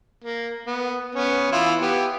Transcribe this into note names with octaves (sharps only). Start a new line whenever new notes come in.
A#3
B3
B3 C#4
E3 E4 F4
B3 G4